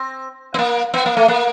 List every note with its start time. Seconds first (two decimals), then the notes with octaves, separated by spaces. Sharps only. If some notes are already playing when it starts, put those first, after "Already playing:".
Already playing: C4
0.54 B3
0.59 A#3
0.94 B3
1.06 A#3
1.17 A3
1.28 A#3